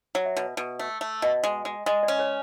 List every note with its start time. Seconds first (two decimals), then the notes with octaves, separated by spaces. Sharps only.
0.15 F#3
0.26 E5
0.37 B2
0.57 B2
0.79 A3
1.01 A3
1.22 B2 D#5
1.44 G#3
1.65 G#3
1.86 G#3 D#5
2.03 D5
2.08 C#4
2.19 C#5